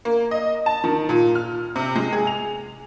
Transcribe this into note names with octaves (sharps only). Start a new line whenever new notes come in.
A#3
D#5
A5
D#3
A#2
F6
C3
G#3
G#4
F7